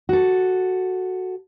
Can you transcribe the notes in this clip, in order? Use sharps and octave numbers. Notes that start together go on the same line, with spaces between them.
F#4 A4